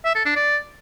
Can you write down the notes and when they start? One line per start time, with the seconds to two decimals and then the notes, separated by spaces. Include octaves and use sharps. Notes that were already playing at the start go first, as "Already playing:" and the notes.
0.05 E5
0.15 A4
0.25 D4
0.36 D5